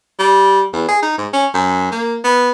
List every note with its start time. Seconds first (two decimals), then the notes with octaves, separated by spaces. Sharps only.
0.19 G3
0.73 E2
0.88 G#4
1.02 D#4
1.18 G#2
1.33 C#4
1.54 F#2
1.92 A#3
2.24 B3